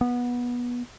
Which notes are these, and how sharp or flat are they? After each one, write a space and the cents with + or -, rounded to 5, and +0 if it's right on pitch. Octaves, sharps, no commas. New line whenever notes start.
B3 -20